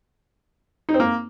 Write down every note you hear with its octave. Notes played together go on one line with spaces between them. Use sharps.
D#4
C4
A#3